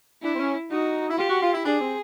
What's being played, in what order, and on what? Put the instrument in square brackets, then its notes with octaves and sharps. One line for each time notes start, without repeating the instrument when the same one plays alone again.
[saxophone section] D4 [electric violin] E4
[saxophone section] C4
C#4
[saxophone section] D#4 [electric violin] F#4
[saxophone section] E4
[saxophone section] F4 [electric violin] G4
[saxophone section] F#4
F4
E4
[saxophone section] D4 [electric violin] G#4
[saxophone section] C4